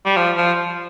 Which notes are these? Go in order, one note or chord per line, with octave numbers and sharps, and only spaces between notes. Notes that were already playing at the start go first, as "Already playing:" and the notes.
G3
F3
F3